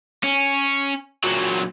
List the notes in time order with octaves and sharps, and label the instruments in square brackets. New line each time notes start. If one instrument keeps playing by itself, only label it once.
[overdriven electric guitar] C#4
A#2 F#3